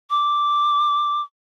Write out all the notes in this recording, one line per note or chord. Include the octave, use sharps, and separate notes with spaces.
D6